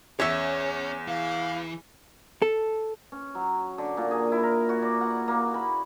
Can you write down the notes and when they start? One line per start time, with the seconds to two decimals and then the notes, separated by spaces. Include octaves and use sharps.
0.20 E2 C#4 C#5 E5
1.07 E3 F5
2.42 A4
3.12 C#4
3.35 F#3
3.78 D3
3.97 A#2
4.11 G#4
4.32 E4
4.43 A#4
4.69 F#4
4.82 D5
5.01 F#5
5.28 A#3
5.54 B5